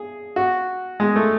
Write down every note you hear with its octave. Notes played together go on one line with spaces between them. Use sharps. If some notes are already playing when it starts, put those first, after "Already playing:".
Already playing: G#4
F#4
G#3
A3